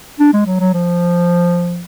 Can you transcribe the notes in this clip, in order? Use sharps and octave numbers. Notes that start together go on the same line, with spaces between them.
D4
G#3
F#3
F#3
F3